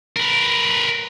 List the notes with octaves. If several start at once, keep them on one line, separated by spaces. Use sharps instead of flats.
A#4 B4